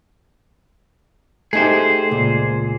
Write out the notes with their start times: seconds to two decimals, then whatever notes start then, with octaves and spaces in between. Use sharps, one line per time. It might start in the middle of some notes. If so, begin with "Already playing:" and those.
1.53 A3 D#4 G4 G#4 C5
2.11 C#2 A#2